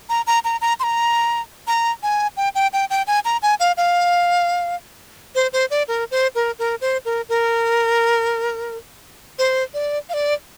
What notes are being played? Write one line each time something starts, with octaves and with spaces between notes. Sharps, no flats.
A#5
A#5
A#5
A#5
C6
A#5
A#5
G#5
G5
G5
G5
G5
G#5
A#5
G#5
F5
F5
C5
C5
D5
A#4
C5
A#4
A#4
C5
A#4
A#4
C5
D5
F5
D5